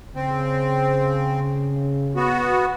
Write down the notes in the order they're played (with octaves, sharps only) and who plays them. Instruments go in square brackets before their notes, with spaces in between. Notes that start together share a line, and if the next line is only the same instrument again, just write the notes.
[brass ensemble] C#3 [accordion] C4
[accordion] B3 F#4